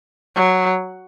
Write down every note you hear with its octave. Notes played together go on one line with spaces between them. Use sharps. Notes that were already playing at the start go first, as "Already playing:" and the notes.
F#3